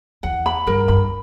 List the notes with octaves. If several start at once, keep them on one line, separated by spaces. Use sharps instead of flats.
E2 F#5
B5
G2 A#4
G2 B5